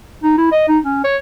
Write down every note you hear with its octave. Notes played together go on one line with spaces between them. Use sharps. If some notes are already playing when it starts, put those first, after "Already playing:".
D#4
E4
D#5
D#4
C#4
C#5